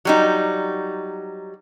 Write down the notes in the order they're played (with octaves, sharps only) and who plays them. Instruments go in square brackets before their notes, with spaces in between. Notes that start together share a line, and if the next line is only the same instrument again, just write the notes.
[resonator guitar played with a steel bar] F#3 G3 D#4